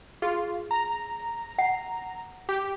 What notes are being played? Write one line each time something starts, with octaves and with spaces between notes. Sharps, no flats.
F4 G#4
A#5
F#5
G4